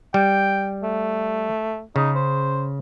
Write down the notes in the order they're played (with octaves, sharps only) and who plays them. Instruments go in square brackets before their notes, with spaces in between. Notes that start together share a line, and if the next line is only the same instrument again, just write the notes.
[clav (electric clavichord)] G3 [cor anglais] G5
[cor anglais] A3
[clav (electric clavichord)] C#3 [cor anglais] D#4
[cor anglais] C5